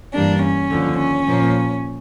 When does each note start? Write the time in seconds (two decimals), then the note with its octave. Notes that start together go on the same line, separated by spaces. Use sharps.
0.14 G2 E3 G3 A#3 D4
0.43 C#4
0.71 D#2 D3 F3
0.99 C#4
1.27 A#2 F3 A#3